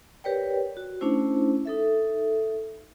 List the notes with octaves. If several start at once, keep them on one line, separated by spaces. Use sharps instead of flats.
G4 A#4 B4 C#5 D5 G5
F#4
A3 C#4 D4 E4 C5
D#4 A4 E5